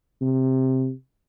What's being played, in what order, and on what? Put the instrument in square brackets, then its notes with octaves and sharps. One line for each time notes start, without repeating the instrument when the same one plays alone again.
[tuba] C3